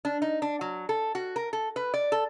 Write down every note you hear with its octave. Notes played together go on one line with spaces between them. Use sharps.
D4
D#4
D4
F#3
A4
F#4
A#4
A4
B4
D5
A4